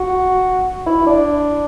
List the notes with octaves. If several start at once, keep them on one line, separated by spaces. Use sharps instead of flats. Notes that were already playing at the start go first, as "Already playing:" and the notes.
Already playing: F#4
E4
D4